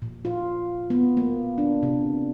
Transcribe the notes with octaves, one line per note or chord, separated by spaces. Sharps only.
A#2
F4
B3
A#3
D4
C3